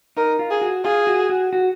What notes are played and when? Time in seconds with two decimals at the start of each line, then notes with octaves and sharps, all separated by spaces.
0.17 D#4 A#4
0.39 F4
0.51 G#4
0.62 F#4
0.84 F4 G#4
1.07 F#4
1.29 F#4
1.53 F#4